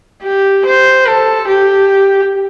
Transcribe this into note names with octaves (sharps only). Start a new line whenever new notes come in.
G4
C5
A4
G4